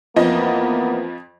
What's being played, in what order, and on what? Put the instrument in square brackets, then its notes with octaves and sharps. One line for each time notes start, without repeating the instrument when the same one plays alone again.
[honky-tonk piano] F2 F3 D#5 [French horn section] E3 A#3 B3